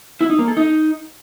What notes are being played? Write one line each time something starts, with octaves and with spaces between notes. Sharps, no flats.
E4
D#4
A#3
A4
D#4